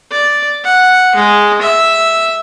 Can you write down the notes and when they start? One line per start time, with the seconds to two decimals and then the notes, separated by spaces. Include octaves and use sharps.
0.12 D5
0.64 F#5
1.16 G#3
1.62 E5